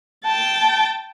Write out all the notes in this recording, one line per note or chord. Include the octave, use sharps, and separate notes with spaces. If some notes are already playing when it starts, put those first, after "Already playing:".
G5 A5